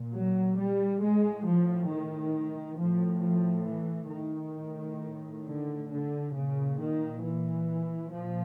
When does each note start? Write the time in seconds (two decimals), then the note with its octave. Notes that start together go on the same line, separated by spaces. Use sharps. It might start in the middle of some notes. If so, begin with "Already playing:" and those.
Already playing: A#2
0.14 F#3
0.58 G3
1.02 A2 G#3
1.47 F3
1.91 D#3
2.79 A2 F3
3.24 F3
3.68 E3
4.12 D#3
4.57 A2
5.45 D3
5.89 D3
6.33 A#2 C#3
6.78 D#3
7.22 E3
8.10 A#2 F3